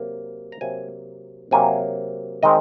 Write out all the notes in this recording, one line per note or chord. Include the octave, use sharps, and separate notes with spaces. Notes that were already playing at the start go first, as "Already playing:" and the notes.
Already playing: C3 F#3 A#3
A#5
C3 F#3 A#3 G#5
C3 F#3 A#3 G#5
D#3 G#3 C4 D#5